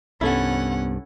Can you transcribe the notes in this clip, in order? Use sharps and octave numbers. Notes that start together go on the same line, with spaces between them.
C2 G2 B3 C#4 E4 A4 F#5